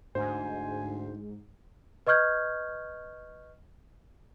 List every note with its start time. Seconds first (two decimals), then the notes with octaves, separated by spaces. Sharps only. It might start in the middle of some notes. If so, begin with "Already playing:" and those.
0.15 D2 G#2 C5 G#5
2.07 B4 D#5 C#6 F6 G6 G#6